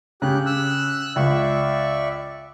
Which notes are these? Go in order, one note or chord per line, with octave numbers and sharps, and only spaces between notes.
C#3 G4 F#6
E6 F#6
C#2 D5 E5 C#6